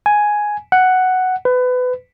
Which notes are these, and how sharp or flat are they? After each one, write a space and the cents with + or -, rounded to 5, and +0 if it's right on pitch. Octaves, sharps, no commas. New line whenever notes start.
G#5 +5
F#5 +5
B4 +25